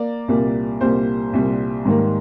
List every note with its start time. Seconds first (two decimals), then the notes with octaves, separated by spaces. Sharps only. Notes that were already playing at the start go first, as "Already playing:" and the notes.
Already playing: A#3 D5
0.28 C2 A#2 G3 A#3
0.81 C2 A#2 G3 A#3 C5
1.33 C2 A#2 G3 A#3
1.85 G#2 D#3 G3 A#3